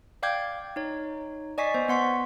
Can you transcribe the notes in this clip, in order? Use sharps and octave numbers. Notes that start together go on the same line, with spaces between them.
D5 F5 G5 D6 G6 G#6
D#4 C#5
D5 D#5 G#5 C#6 B6 C7
B3 C5
B3 F#5 C6 C#6 B6